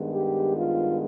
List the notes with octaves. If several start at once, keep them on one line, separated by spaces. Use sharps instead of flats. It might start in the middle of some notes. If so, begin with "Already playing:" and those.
Already playing: G2 D#3 G#3 B3
G4
F4